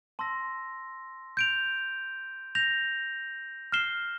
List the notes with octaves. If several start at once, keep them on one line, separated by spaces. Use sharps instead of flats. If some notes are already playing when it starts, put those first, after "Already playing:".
A5 C6 E6 A#6
G6 D7 F7
G6 A#6 F7
F6 C7 E7 G7